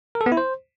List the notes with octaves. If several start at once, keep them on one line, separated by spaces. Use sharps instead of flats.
A#4
A4
B3
E4
C5